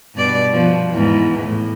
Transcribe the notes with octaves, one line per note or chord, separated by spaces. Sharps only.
G2 B2 D5
B2 F3
E2 G#2
A2